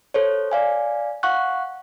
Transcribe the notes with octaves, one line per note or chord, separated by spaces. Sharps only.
A4 C5 C#5
D5 F5 G#5
F5 F#5 C#6 F#6